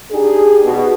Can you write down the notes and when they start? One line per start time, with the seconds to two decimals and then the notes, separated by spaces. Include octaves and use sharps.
0.11 D4 D#4 G4 G#4
0.64 B2